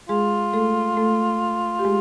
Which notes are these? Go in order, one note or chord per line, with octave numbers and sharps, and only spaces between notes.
G#3 F4 G#4
A3 A4
A3 A4
G4
G#3 G#4